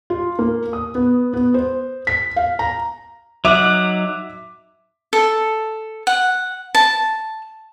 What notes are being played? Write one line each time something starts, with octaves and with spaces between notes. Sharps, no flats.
F4
A#3
D#6
B3
B3
C5
B6
F5
A#5
F#3 D#4 E5 F#5 D6
A4
F#5
A5